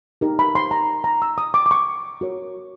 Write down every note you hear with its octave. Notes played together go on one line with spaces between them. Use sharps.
D#4 G4 A#4
B5
C6
A#5
A#5
E6
D#6
D6
D6
C#6
F#4 A#4 C#5